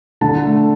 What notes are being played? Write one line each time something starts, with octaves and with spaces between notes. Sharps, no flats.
D3 A5
A3